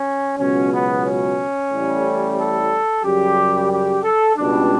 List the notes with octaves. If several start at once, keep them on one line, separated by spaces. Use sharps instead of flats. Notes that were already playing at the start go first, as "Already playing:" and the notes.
Already playing: C#4
C#2 B2 F#3 C#4
B3
C#4
A1 A2 G3
A4
F#2 C#3 G3 G4
G4
A4
C#2 B2 G3 D4